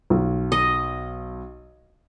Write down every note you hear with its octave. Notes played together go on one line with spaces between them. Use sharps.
B1
D#5